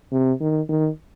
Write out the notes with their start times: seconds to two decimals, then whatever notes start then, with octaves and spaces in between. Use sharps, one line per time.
0.12 C3
0.41 D#3
0.69 D#3